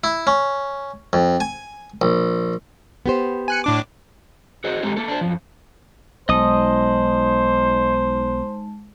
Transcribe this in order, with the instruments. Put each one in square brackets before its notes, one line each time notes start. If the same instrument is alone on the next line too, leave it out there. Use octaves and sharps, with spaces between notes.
[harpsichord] E4
C#4
F2
G#5
A#1
[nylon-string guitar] B3 G4 C5
[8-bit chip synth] G#5 F#6 C#7
A2 D4 D6
[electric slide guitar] F#4 G#4 C5 D#5
G#3 C4 D#4 G4 A4
A#3 A4
D4 C5
F#2 F3
[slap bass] B1 [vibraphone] G#3 D#4 A5 [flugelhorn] C5 [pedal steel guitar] D#5 D#6